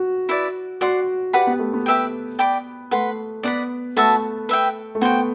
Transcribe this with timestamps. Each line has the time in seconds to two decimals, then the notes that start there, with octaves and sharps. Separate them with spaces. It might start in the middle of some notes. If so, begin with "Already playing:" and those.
Already playing: F#4
0.29 E4 B4 D5
0.81 F#4 D5 F#5 C6
1.33 G4 B4 D5 F#5 B5
1.47 B3
1.59 A3
1.74 B3
1.86 G4 B4 E5 G5
2.39 D5 G5 B5 D6
2.91 A3 B4 F#5 C6
3.43 B3 D5 F#5 B5
3.96 A3 F#4 B4 E5 A5
4.49 B4 E5 G5
4.95 A3
5.01 B3 F#4 C5 G5